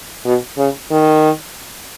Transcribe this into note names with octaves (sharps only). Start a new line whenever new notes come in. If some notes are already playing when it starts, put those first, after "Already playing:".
B2
C#3
D#3